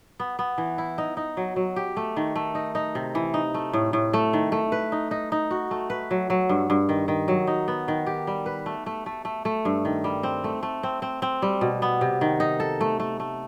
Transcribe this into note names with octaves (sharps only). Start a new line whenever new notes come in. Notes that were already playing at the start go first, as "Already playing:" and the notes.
B3
B3
E3
E4
D#4
D#4
F#3
F#3
G4
A3
D#3
A3
D#4
D#4
C3
E3
D#4
A3
A2
A2
A3
D#3
A3
B4
D#4
D#4
D#4
F#4
A3
B4
F#3
F#3
G2
G2
D#3
D#3
F#3
D#4
B3
D#3
G4
G3
B4
A3
A3
A3
A3
A3
G2
D#3
G3
C4
A3
A3
C4
C4
C4
G3
B2
B3
C3
D#3
D#4
A4
A3
A3
A3